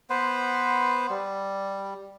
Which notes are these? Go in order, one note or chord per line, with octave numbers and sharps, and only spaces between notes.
B3 B4 C5
G3